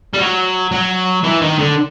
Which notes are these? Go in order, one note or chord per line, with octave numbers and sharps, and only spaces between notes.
G3
F#3
F#3
E3
D#3
D3